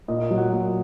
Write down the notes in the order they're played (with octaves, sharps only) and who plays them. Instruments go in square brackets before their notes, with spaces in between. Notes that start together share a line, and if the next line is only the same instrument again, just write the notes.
[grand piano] A#2 D#5
D#5
F#3
F#5
A#2